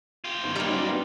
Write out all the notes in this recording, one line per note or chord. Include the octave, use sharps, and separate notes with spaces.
F4 G4
G1 D#3
G3 A#3
F#3 C#4 D#4
B3 D4